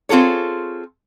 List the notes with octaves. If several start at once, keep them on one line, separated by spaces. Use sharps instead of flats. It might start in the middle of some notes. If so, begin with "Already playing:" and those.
C4 F4 G#4 A4 C#5